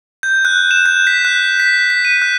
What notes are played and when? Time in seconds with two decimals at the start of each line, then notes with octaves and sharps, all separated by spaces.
0.23 G6
0.45 F#6
0.71 E7
0.86 G6
1.07 B6
1.25 F#6
1.60 B6
1.90 B6
2.05 D#7
2.22 F#6